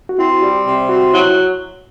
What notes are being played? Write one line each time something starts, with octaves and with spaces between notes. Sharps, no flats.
F#4
C4 E4
F#4
G3 G4
C3
C4 F#4
F#3 E4